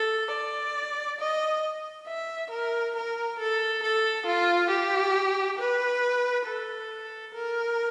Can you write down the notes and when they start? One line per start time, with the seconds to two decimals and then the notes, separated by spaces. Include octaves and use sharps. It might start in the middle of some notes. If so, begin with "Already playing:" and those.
Already playing: A4
0.32 D5
1.20 D#5
2.08 E5
2.51 A#4
2.96 A#4
3.39 A4
3.83 A4
4.26 F4
4.71 G4
5.59 B4
6.46 A4
7.34 A#4